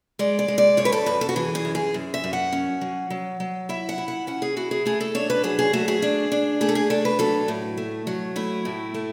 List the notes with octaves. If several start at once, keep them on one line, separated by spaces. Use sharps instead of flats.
G#3 D5
D5
G#3
D5
F#2 C#5
B4
A4
F#2 B4
A4
F#4
E3 G#4
G#4
F#2
G#4
F#2
E5
F#2
F#5
C#4
F#3
F#3
F#3
E4 E5
F#5
E4
F#5
C#4 F#5
G#4
E4 F#4
G#4
A3 G#4
A4
D4 C#5
B4
F#3 G#4
G#4
A3 F#4
G#4
D4
D4
A3 G#4
A4
G#4
D4 A4
B4
F#3 A4
A2
A3
F#3
A3 E4
A2
A3